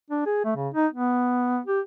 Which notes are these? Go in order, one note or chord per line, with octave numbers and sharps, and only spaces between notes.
D4
G#4
A3
C#3
D#4
B3
G4